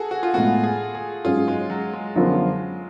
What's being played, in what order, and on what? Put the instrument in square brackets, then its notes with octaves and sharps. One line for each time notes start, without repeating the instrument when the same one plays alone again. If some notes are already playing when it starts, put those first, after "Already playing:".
Already playing: [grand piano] F#4 G#4 A4
F#4
F4
[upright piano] A2 G#3 B3 [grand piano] F#4
[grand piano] G#4
G#4
[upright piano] G#2 F#3 C#4 G#4 [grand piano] F4
[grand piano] G#3
F#3
G#3
[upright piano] F#2 D3 F3 B3 F4 [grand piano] F#3